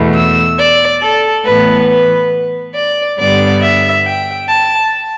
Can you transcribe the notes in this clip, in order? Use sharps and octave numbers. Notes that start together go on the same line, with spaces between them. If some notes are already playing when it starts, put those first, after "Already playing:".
Already playing: E2 B2 A3
E6
D5
A4
A2 E3 B3 B4
B4
D5
G2 D3 G3 B3 D5
E5
G5
A5